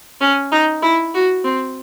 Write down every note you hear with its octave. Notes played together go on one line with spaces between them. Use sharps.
C#4
D#4
E4
F#4
C4